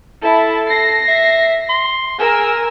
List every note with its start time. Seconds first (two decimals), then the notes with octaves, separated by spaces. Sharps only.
0.23 E4 A4 A5
0.67 A#6 C7
1.08 E5
1.69 C6
2.19 G#4 A#4 G#5 E6